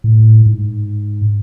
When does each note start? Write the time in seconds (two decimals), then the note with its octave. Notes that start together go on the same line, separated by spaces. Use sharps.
0.04 A2
0.46 G#2